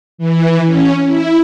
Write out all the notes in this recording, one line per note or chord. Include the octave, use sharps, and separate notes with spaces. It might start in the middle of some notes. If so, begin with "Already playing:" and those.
E3
C#4
E4